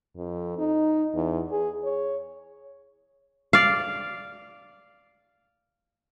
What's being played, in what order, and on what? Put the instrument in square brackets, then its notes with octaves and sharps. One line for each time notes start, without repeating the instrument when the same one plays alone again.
[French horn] F2
D#4
E2
G#4
C#5
[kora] D5 F5